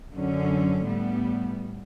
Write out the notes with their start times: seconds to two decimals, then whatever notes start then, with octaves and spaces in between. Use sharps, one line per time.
0.13 F#2 D3 F#3 C#4
0.85 A2 G3 B3